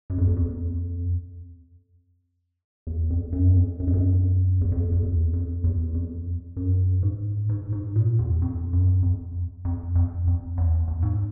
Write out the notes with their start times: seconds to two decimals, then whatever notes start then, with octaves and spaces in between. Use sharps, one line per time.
0.10 F#2
0.18 F2
0.28 E2
0.37 F2
2.87 E2
3.10 F2
3.32 F#2
3.56 F2
3.80 F#2
3.87 F2
3.94 F#2
4.61 E2
4.72 F2
4.92 F2
5.03 E2
5.33 F2
5.64 E2
5.95 F2
6.56 F#2
7.03 G#2
7.49 G#2
7.73 G#2
7.96 A#2
8.19 E2
8.42 F2
8.73 F#2
9.03 F2
9.65 F2
9.95 F2
10.27 F2
10.57 E2
10.88 E2
11.02 G#2